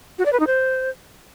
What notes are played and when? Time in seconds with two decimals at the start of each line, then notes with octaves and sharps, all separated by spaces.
0.18 F#4
0.26 D5
0.33 B4
0.40 D#4
0.47 C5